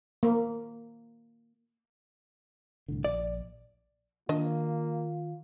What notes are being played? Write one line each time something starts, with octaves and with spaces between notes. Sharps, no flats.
A#3
C2 A2 D3
A#1 D5
D#3 A#3 D4 F4 D#5